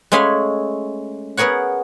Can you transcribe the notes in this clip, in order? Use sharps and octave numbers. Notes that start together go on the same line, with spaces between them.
G#3 A3 C#4 G#4 F5 B5
B3 G#4 A#4 C#5 F#5